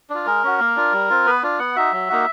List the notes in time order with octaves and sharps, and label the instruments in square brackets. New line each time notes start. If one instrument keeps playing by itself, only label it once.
[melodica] D4 F4
G#3 A#4
C#4 F#4
A#3
D4 F4
G3
C4 F4
B3 B4
D4 F4
B3 F#5
D#4 F#4 E5
F#3
A#3 D#4 F#4